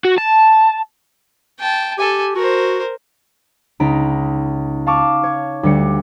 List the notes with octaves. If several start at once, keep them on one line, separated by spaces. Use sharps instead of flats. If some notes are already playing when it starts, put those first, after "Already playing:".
F#4
A5
G5 A5
G4 A4 G#5
F#4 A#4 C5
C#2 D#4 A#5 B5 D7
F5 A5 C#6 D6
C#5
D2 G3 C#7